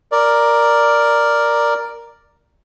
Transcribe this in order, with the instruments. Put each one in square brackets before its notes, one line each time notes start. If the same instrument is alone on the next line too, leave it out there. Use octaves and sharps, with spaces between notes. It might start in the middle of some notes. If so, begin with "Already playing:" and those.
[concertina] A#4 D5